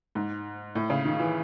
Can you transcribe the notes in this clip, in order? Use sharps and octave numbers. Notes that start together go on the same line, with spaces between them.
G#2
A2
C#3
D#3
E3